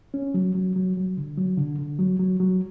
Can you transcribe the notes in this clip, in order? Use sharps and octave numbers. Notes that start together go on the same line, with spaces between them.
C#4
F#3
F#3
F#3
F#3
D3
F#3
D3
D3
F#3
F#3
F#3